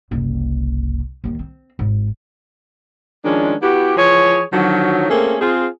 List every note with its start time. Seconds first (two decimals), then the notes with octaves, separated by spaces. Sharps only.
0.11 F#1 C2
1.24 D#2 D#3
1.39 C4
1.79 G#1
3.25 D#3 F3 G#3 C#4 D4
3.62 B3 E4 F#4 G4
3.97 E3 F3 G#4 C#5
4.53 D3 D#3 F3 F#3
5.09 A3 A#3 C4 C#4 G#4 A4
5.41 C4 F4 G#4